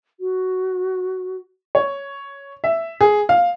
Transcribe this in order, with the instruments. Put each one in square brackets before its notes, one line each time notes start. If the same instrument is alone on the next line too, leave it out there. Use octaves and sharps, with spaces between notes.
[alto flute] F#4
[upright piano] C#5
E5
G#4
F5